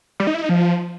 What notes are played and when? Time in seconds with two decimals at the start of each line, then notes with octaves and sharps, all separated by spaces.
0.20 G3
0.27 D#4
0.34 E4
0.42 D#4
0.49 F3